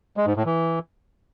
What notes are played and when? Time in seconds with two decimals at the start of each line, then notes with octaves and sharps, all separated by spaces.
0.17 G#3
0.27 G#2
0.36 A2
0.46 E3